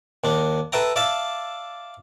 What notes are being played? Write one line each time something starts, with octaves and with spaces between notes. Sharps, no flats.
D#2 D4
A4 B4 E5 G5 A#5
D5 E5 F5 A5